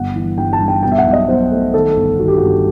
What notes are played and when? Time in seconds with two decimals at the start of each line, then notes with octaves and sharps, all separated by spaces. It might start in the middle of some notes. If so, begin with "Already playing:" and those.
Already playing: G1 F#5
0.15 E3
0.37 G2 G5
0.53 A5
0.60 G2
0.68 G5
0.83 B2 G5
0.92 E5
0.98 F#5
1.06 B1
1.13 D#5
1.28 B1 C5
1.51 A3
1.74 D#3 A4
1.96 G1
2.19 D#3 F#4
2.28 G4
2.37 G2 F#4